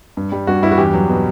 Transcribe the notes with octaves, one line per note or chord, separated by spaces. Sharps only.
G2
G3
G2 F#4
G2 E4
F#4
E2 G4
F#3
B2